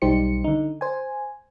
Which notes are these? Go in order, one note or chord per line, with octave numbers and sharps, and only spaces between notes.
B1 G3 D#4 G4 C5 C#7
D3 D#4
C5 G#5